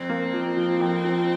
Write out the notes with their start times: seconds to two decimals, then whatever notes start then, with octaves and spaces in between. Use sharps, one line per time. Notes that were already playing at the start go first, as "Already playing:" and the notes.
Already playing: F2 C4
0.09 A#3
0.33 F3
0.57 F3
0.81 F2
1.04 F3